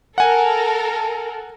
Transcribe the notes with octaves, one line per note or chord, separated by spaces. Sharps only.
A4 A#4 F#5 G#5